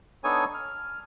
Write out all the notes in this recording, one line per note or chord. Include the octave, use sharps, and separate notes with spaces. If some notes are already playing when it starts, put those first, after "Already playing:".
B3 D4 D#4 A4 C#5 G#5
F6